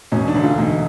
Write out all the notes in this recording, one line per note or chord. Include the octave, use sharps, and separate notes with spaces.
E1 C#4
D4
D2
F4
E1 D#4